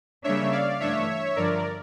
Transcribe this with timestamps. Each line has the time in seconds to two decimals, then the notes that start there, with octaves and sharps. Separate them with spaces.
0.23 C#3 G3 A#3 D4 C#5 E5
0.52 D5 F5
0.80 G2 E3 A3 D4 C#5 E5
1.36 G2 D3 F3 A#4 D5